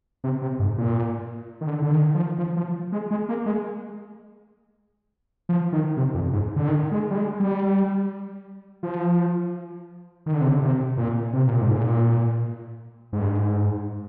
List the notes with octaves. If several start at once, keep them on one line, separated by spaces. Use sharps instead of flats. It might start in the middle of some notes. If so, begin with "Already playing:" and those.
C3
C3
G#2
A#2
D#3
D3
D3
D#3
F3
F3
F3
G#3
G#3
A#3
G#3
F3
D#3
C3
F2
G#2
D3
D#3
G#3
G3
G#3
G3
F3
D#3
D3
C3
D3
C3
A#2
C3
A#2
G#2
A#2
G#2
G2
G#2